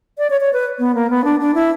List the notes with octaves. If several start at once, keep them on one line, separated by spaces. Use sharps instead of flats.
D5
C#5
C#5
B4
B3
A#3
B3
D4
D4
E4